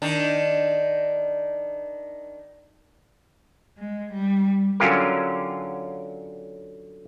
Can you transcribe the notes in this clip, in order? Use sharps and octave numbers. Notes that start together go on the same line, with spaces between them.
D#3 D4
G#3
G3
D3 F#3 C#4 F4 G4 A#4